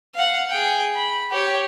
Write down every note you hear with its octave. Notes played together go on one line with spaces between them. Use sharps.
F5 F#5
G#4 G5
B5
G4 C#5